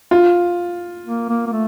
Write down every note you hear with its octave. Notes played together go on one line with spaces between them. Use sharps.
F4
A#3
A#3
A#3
A3